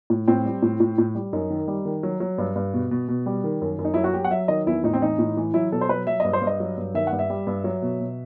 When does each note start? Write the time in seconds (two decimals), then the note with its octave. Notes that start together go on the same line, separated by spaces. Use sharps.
0.10 A2
0.28 A2 C4
0.45 G3
0.62 A2
0.80 A2
0.98 A2
1.15 G3
1.33 F#2 D#4
1.50 D#3
1.68 G3
1.85 D#3
2.03 F#3
2.20 F#3
2.38 G2
2.56 G2
2.74 B2
2.91 B2
3.08 B2
3.26 G3
3.44 D#3
3.61 F#2
3.79 F#2
3.85 D#4
3.94 F#3 E4
4.04 F#4
4.13 F#3 G4
4.24 F#5
4.31 F#3 E5
4.48 D#3 D#5
4.67 E2 E4
4.84 A2 D#4
4.93 C4
5.01 E3 D#4
5.19 A2
5.37 E3
5.54 F#3 E4
5.72 B2 A4
5.81 C5
5.89 F#3 B4
6.07 F#3 E5
6.20 G2 D#5
6.33 C5
6.41 G2
6.47 D#5
6.60 F#3
6.77 G2
6.94 D#3 E5
7.07 F#5
7.12 G2
7.19 E5
7.30 G3
7.47 G2
7.64 F#3
7.82 B2
8.00 B2